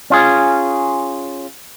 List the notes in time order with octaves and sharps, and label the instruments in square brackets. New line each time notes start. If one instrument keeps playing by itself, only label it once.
[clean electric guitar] C#4 F4 G#4